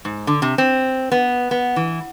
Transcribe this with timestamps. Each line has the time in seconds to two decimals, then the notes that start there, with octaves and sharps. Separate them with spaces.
0.05 G#2
0.27 D3
0.42 C3
0.58 C4
1.12 B3
1.51 B3
1.76 E3